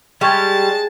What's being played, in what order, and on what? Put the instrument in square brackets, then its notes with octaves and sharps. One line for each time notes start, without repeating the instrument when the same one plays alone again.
[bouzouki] G3 [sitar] G#3 [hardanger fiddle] A5 [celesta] C6 C#6 G#6